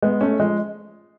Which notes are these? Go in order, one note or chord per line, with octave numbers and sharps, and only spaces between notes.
G#3 B3
A3 C#4
F3 G#3